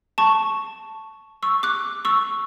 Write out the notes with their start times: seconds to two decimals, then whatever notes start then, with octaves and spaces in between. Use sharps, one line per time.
0.18 A5 C#6
1.43 C#6 E6
1.63 D6 F#6
2.05 C#6 E6